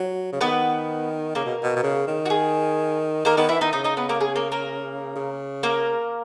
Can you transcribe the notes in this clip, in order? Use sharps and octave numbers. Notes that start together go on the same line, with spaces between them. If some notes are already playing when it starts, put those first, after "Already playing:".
Already playing: F#3
C#3
D#3 B3 B4
C#3 A#3 A#4
B2
B2
B2
C#3
D#3
F#4
G#4
D#3 A#3 A#4
D#3 B3 B4
E3 E4 E5
D#3 D#4 D#5
C#3 D#4 D#5
D#4 D#5
B3 B4
A#3 A#4
G#4
A#3 A#4
A#3 A#4
C#3
A#3 A#4